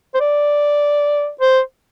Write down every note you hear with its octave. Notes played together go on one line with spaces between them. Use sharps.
C5
D5
C5